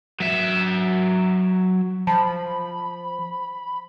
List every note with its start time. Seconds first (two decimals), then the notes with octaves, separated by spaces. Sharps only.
0.20 F#3 E5
2.07 F3 A5 B5